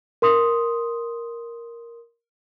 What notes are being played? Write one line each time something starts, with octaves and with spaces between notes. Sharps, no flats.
A#4 C6 D#6